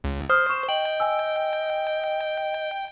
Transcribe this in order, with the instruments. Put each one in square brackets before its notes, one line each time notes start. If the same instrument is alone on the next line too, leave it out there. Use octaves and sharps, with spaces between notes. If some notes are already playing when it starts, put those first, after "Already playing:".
[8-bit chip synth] C#2
[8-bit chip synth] C5 [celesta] D#6 F6
[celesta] C#6 E7
[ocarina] D#5 [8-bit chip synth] G5 [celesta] F#7
[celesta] G#5 E6